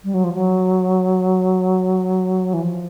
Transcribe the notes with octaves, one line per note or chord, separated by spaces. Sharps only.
G3
F#3
F3
F#3
E3
F3